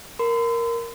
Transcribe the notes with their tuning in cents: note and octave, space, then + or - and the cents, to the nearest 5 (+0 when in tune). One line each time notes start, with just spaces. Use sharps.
A#4 +0 C6 -45